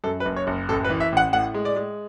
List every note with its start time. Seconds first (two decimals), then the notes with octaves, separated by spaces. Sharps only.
0.04 F#2 A4
0.20 B4
0.25 F#1
0.36 C#5
0.47 F#1
0.68 A1 A4
0.84 B4
0.90 E3
1.00 E5
1.12 A1 F#5
1.33 A2 F#5
1.54 G#3
1.65 D5
1.76 G#3